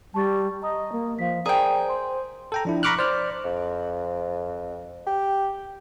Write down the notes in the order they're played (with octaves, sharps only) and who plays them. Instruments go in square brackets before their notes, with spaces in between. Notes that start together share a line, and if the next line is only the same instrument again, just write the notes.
[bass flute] G3 [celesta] A5 C#6 A6
[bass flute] D#5 [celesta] A#5 D#6
[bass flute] A#3
[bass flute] F3 [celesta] F5 B6
[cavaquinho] G#4 G5 [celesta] A#4 D5 A#5 [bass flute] C5
[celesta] C6
[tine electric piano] A4 G5 A#5
F3 D4 E4
A#5 B5 C#6 D6 F6 F#6
C5 D5 F6
[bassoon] F2
G4